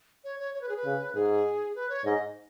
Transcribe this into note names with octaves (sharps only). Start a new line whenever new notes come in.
C#5
C#5
C#5
B4
G#4
B4
C#3
G#2 G#4
B4
C#5
G#2 D#5